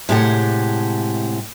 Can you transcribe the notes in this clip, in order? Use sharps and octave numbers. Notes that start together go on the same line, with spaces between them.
A2 C3 G#3 G4 C#5 F#5